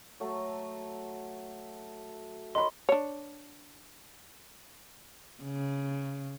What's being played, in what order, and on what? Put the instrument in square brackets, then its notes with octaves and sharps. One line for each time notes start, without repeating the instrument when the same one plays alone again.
[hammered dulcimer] F#3 A3 A4
[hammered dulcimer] A#4 C#5 [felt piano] D#5 B5 [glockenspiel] C6
[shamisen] D4 C#5
[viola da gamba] C#3